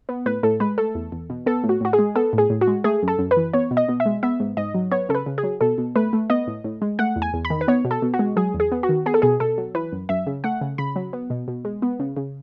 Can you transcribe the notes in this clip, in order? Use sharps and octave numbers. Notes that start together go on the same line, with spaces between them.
B3
A2 B4
A2 A4
G#3 B4
A3 A4
E2
E2
B2
B3 A4
A2
F#4
A2 F#4
G#4
G#3
B3 A4
A2
G#4
A2
F#4
G#3
A3 G#4
F#2
A4
F#2
B4
E3
B3 C#5
B2
D#5
B2
E5
G#3
B3 E5
G#2
G#2 D#5
F#3
B3 C#5
C#3 A4
B4
C#3
G#4
F#3
B2 A4
B2
A3 B4
A3
B3 D#5
A2
A2
G#3
A3 F#5
E2
G#5
E2
B5
D#3
B4
B3 C#5
B2
A4
B2
F#4
G#3
F#3 G#4
E2
G#4
B3
F#4
D#3
B3 G#4
A4
B2 G#4
B2 A4
F#3
E3 B4
F#2
F#2 E5
C#3
A3 F#5
C#3
C#3 B5
F#3
B3
B2
B2
G#3
B3
C#3
C#3